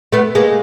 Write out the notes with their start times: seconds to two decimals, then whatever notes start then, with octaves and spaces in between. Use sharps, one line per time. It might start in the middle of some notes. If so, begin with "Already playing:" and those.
0.12 A3 B3
0.35 G#3 A#3